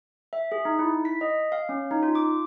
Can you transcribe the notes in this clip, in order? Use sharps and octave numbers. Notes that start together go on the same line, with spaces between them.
E5
G#4
D#4
E4
B6
D#5
F5
C#4
D#4
F4
D6